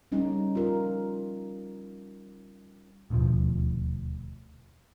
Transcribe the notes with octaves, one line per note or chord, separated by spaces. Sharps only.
G3 C#4 D#4
F4 A#4
D#1 D2 B2 F3